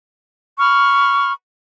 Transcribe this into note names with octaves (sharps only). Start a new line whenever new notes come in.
B5 C#6 F6